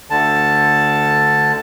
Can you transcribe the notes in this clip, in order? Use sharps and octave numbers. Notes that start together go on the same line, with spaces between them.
D2 D3 A5